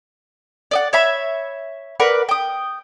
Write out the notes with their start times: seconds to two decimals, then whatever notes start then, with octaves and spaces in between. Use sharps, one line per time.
0.71 D5 D#5 F#5
0.93 C#5 E5 B5
2.00 A#4 B4 D5 F#5
2.29 G5 D#6